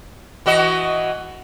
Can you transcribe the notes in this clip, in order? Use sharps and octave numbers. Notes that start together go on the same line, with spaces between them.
E3 F#4 D#5